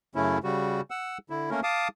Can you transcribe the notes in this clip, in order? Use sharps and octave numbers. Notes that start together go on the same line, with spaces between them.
F#2 C#3 A3 C#4 E4
C#3 G3 F#4
F#5 E6
D3 E4
A3 A#3 C#4 A#4
F5 A5 D6 D#6